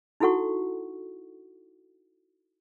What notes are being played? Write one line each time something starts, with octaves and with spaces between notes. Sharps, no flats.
D#4 E4 F#4 A4 F#5 C#6